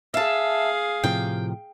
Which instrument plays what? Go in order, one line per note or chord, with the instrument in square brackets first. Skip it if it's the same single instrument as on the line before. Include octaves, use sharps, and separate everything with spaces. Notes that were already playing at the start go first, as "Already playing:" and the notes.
[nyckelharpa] G#4 F5 [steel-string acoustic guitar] E5 A5
[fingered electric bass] A2 C3 F3 [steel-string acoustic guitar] G5